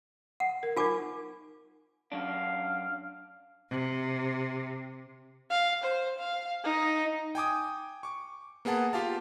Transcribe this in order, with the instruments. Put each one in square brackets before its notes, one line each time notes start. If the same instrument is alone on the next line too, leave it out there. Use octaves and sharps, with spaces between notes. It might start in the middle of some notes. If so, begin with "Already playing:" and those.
[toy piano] F#5
[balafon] A#4
[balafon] D#4 A#4 [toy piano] F4 G#5 D6
[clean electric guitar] F#2 D4 [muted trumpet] F5
[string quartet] C3
[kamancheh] F5
C5
F5
D#4
[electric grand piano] G5 G#5 D6 D#6
C#6 D6
A#3 B3 G#4 F#5 A5
F4 G4 F5 A5